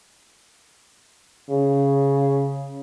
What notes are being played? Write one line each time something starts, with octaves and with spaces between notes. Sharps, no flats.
C#3